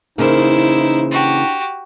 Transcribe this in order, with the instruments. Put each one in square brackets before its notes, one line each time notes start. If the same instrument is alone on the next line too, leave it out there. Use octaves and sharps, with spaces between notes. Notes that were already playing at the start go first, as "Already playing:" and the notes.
[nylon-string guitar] C#3 E3 A#3 [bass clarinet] D#4 [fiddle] E4 C5
[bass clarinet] D4 [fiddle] F#4 G4